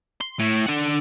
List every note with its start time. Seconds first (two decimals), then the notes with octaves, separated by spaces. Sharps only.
0.21 C6
0.39 A2
0.67 D4 F#5